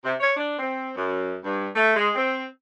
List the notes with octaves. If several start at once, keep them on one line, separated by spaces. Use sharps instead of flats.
C3
C#5
D4
C4
F#2
G2
A3
G#3
C4